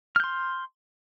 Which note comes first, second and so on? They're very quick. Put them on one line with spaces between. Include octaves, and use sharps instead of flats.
F6 G6 C6